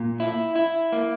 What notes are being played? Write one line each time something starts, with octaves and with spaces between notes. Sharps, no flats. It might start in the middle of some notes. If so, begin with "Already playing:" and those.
Already playing: A#2
E4
E4
A#3